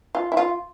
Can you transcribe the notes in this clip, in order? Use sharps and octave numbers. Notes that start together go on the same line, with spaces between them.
F4
E4
F4